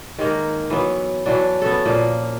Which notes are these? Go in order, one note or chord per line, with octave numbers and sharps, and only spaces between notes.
D#3 G#3 A#3 A#4
E3 F#3 B3
E3 F#3 D4
B3 C#4 A4
A#2 F3 A#3